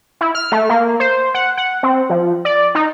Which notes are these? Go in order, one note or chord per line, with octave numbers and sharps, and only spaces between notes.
E4
F6
A3
A#3
C5
F#5
F#5
C4
F3
D5
D#4